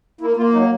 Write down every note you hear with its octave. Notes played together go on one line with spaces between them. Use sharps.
A#3 E4
A#3 F4
F#3 D#4